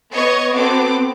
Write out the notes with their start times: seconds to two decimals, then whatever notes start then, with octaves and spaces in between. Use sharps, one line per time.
0.12 B3 C#5 D#5 C#6 G#6
0.53 B3 C4 F#4 A4 D6